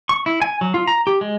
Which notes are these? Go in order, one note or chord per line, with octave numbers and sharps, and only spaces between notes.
C#6
E4
G#5
F#3
F4
A#5
G4
G#3